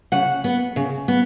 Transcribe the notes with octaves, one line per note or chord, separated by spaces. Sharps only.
C#3 F#5
B3
C#3
B3